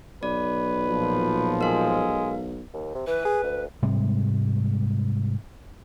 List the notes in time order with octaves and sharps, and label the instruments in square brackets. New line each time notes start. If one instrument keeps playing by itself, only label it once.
[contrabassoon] B1 [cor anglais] B4 [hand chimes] D5
[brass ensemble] A#2 F3
[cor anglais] G#3 [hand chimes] A#4 F5
[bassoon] D#2
C3
[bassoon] E3 [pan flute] B4
[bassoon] G#4
D2
[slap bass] G#2 C3 G3 G#3